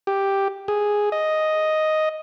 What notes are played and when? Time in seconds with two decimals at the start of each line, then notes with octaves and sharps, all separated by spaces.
0.07 G4
0.68 G#4
1.12 D#5